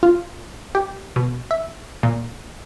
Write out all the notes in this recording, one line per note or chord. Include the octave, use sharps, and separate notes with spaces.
F4
G4
B2
E5
A#2